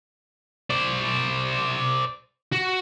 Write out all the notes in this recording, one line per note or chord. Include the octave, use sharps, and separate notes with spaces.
C5 D5
F#4